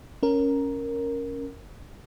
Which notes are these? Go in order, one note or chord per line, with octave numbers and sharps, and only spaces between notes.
C#4 A#4